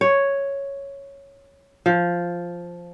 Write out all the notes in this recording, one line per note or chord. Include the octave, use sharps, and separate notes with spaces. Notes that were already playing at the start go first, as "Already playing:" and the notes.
C#5
F3